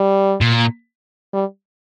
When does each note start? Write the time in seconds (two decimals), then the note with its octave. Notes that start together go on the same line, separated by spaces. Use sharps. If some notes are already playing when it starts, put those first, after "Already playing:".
Already playing: G3
0.41 A#2
1.33 G3